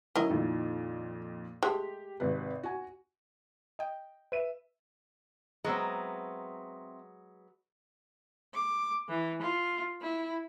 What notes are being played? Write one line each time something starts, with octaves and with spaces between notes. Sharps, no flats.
F#3 C#4 E4 A#4 D#5
F2 A#2 D#3
G#3 A3 G4
G#1 C3 B4
F#4 G#5
D#5 G5
B4 E5 D#7
F#3 G#3 B3 C4 E5 A#5
D6
E3
F4
E4